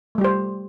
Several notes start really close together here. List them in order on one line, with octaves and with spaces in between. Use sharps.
A3 G3 G4 C5